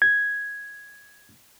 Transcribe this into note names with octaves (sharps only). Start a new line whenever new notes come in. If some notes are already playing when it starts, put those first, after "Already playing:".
G#6